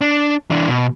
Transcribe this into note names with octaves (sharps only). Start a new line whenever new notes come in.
D4
E3 D4
B2